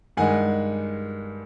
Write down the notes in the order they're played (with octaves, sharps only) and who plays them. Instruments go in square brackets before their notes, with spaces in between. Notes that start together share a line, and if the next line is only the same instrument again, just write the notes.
[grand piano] G2 D#3 G#3 F#5 G#5